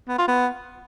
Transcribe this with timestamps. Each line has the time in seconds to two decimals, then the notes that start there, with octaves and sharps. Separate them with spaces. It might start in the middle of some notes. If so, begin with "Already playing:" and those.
0.09 B3
0.18 F4
0.28 B3